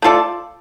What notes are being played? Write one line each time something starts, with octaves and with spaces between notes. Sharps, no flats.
A3 F4 A4 D5